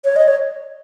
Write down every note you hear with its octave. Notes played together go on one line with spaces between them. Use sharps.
C#5
D#5
C#5